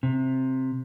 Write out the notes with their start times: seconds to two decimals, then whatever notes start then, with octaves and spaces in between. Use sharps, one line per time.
0.03 C3